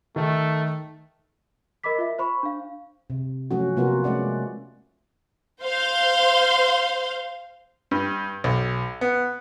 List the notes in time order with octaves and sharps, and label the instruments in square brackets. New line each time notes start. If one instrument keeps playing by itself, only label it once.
[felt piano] D#3 [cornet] A3
[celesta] A#4 D#5 B5 D6 B6
F4 E5
C5 B5 C#6
D4 F5
[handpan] C3
F3 F#3 A3 C#4 F#4
C3 A#3 B3 F4 F#4 A#4
G#3 A3 C#4 D5 F#5
[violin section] C5 F5 C6
[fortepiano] G2
B1
B3